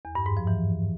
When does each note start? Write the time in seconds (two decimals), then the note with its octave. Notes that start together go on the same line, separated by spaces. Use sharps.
0.05 E2
0.15 G2
0.26 G#2
0.37 F3
0.47 E3